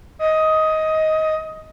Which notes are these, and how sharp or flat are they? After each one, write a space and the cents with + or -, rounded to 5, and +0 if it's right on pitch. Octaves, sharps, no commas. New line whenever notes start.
D#5 +15